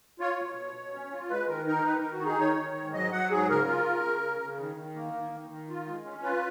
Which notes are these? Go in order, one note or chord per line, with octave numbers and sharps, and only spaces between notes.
F4 C#5
B2
B2
B2
C#4
F4
G#3 B4
D#3 A#4
D#4 A#4
D#3 B4
D#3 A#4
F#4
D#4 G#4
D#3 C#5
D#3
G#2
F#3 D#5
F#3 F#5
G#2 G#4
C#3 A#4
F4
C#3
C#3
C#3
C#3
D#3
D#3
A#3
D#3
D#3
D#3
F4
G#3
C#4
F4 B4